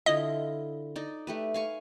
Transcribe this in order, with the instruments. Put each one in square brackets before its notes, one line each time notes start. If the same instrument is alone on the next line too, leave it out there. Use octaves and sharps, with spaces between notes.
[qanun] D3 E4 F4 [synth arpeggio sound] D#5
[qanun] D#4 D5
A3 G4 B4
F5 G#5 C#6